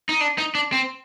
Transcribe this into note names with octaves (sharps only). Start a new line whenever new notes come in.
D#4
D4
D#4
D4
C4